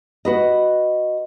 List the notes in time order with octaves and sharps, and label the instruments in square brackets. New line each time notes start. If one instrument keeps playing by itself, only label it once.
[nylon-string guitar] F#4 B4 D#5